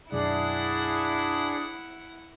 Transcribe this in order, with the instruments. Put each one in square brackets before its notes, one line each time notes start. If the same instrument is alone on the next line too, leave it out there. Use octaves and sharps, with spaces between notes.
[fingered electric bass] B1 F#2 [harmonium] D4 G#4 D5 [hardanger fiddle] E4 F#5